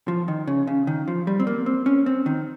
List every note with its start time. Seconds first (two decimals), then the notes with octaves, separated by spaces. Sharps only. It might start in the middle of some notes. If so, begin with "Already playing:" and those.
0.08 F3
0.28 D#3
0.47 C#3
0.67 C#3
0.87 D#3
1.08 F3
1.27 G3
1.40 C4
1.47 A#3
1.66 C4
1.86 C#4
2.06 C4
2.26 D#3